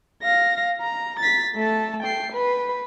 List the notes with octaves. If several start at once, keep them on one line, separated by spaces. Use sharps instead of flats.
F5 A#6
A#5
A6 B6
A3 A5
G5 C7
B4